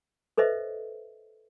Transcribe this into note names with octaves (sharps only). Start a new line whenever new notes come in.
A4 B4 C5 D#5 E5